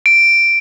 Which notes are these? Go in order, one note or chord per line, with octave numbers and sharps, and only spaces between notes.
D7